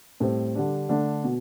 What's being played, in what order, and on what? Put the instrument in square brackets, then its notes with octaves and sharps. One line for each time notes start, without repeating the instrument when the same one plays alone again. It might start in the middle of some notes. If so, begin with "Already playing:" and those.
[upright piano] A2 G3 C4
D3 G3 D4
D3 A3 D4
B2